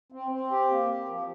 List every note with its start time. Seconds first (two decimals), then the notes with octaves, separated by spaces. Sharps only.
0.12 C4
0.31 C4
0.51 G4
0.70 A#3
0.89 G4
1.08 F3